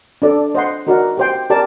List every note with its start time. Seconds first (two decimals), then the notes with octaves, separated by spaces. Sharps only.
0.22 D4 A4 D5
0.55 C5 D#5 F#5 C6
0.87 D#4 F#4 A#4 D5 F#5
1.17 G4 C5 G5 C6
1.50 G4 A#4 D5 A5